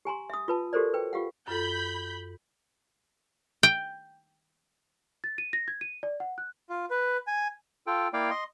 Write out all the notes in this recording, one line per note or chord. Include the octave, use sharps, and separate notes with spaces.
G4 G#5 A#5 C6
E5 D#6
F4 B4 A5
F#4 G4 A4 A#4 C5 D5
B4 G5
F4 G4 F5 F#5
F#2 F4 A4 B5 G6
G5
A6
D#7
A#6
G#6
D#7
D5
F#5
F#6
F4
B4
G#5
F4 A4 G5
A#3 E4 D5 F5 G5
D#5 C6